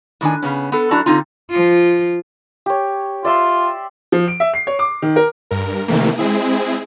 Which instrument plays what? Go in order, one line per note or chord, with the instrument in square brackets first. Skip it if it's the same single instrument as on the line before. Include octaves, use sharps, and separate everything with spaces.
[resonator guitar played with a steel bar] A2 D#3 D4 G#5
C#3 B3 C#4
B3 A4
F#2 D4 E4 F#4 A5 A#5
D3 C4 D#4 F4
[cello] F3 F4
[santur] G4 C#5
[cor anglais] F4 [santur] D5 E5 C6
[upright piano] F3
D7
E5
C7
C#5
D6
D#3
A#4
[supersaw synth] G2 A#4
C3 D#3 E3 A3 A#3
G#3 C4 E4 G#4